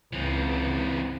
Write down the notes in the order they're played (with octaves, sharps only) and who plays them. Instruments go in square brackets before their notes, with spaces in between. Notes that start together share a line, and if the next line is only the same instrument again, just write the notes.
[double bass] C#2 [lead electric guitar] E3 C4